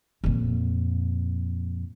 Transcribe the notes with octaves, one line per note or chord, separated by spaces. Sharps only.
F2 A#2